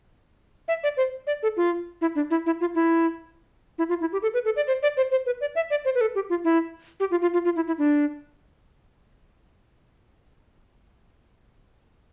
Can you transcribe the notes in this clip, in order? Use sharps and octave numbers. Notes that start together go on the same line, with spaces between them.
E5
D5
C5
D5
A4
F4
E4
D4
E4
E4
F4
E4
E4
F4
E4
G4
A4
B4
A4
D5
C5
D5
C5
C5
B4
D5
E5
D5
C5
B4
A4
G4
F4
E4
G4
F4
F4
F4
F4
E4
E4
D4